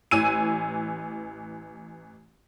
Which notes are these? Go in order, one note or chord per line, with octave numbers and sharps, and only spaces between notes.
A1 E3 G#5 E6 D#7